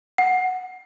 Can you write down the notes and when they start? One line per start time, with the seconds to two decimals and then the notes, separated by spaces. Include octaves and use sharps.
0.18 F#5